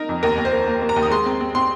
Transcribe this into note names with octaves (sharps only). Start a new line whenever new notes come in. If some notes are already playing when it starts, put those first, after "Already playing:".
Already playing: D#4 A#4
F2
D#2 A#4
D#2
C5
A#3
A#3
A#3
A#5
D#2
D#6
G#3 C6
C4
C4
C4 C6